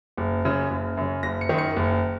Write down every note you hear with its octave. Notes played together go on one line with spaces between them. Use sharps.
F#1
F#2 C#3
F#1
F#2 C#3
F#1 A#6
C#7
F#2 D#3
C#7
F#1